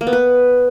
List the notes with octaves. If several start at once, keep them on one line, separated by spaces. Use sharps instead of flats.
A#3
B3
B4